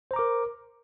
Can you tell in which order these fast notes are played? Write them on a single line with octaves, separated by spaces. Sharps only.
C5 A#5 D6 A#4